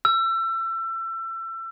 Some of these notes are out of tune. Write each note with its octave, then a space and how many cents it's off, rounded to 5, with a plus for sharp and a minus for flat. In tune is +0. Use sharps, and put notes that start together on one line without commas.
E6 +30